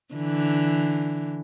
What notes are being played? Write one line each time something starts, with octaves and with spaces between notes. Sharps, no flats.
D3 E3